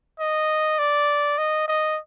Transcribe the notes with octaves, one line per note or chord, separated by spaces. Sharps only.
D#5
D5
D#5
D#5